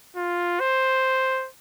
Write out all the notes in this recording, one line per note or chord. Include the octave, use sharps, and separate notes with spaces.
F4
C5